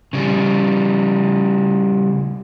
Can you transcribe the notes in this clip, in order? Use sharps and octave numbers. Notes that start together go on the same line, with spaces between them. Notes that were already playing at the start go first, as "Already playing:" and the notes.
C#3 G3